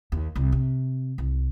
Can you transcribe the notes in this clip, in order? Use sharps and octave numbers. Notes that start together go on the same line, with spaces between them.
D#2
C2
C3
C2